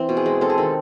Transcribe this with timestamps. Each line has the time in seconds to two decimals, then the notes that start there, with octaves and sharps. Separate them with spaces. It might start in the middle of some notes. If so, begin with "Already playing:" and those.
Already playing: E3 C4
0.09 B2
0.17 G#4
0.26 G#3
0.41 C4 A4
0.50 G#4
0.58 D#3 A4